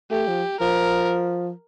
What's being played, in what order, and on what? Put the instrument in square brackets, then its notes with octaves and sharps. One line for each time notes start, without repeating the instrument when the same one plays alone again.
[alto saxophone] A3 [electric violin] G4
[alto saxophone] F3
[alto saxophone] F3 [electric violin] A#4